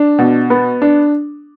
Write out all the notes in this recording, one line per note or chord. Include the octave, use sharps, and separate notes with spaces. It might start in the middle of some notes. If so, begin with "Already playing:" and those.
Already playing: D4
B2
B3
D4